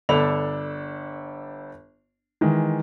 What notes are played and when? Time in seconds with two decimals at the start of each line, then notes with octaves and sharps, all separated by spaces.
0.09 G1 D4 A4 B5 F7
2.41 D#3 E3 G#3